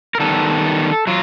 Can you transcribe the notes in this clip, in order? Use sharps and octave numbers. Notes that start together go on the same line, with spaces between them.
A#4
D#3 G3 B3 A4
F#3 F4